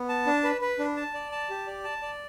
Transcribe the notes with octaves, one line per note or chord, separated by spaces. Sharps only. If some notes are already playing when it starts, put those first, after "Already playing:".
Already playing: B3
A5
D4
B4
B4
D4
A5
D5
A5
G4
D5
A5
D5